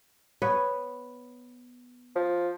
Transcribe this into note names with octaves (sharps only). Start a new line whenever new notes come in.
B3 B4 C#5
F3